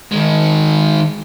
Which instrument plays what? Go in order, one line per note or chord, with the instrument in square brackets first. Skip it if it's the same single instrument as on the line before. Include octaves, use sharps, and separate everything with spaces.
[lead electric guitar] D#3 G#3